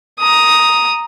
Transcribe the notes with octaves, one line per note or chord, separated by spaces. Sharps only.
A#5 D#6